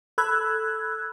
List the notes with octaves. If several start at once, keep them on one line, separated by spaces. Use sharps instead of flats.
A4 B5 E6 F#6 G#6